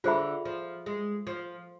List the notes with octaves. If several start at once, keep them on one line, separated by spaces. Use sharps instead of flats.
D3 F4 G#4 C5 E5 B5
F3
G#3
F3